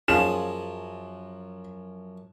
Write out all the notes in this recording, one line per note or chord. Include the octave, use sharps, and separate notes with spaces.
F#2 F3 C#4 F4 G#4 E7